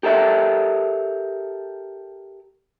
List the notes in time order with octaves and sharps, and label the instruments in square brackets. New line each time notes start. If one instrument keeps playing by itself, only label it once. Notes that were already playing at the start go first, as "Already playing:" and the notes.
[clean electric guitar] G4 A4 A#4 E5